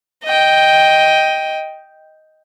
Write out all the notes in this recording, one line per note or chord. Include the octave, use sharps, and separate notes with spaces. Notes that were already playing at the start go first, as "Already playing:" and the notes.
D#5 G5